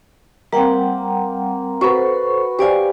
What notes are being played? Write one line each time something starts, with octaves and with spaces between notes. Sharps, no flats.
G3 A#3 C4 F#5 G5
F#4 A4 B4 C5
G4 C5 D5 F5 G#5